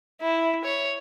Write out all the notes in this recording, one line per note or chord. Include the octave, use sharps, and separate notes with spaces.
E4
C#5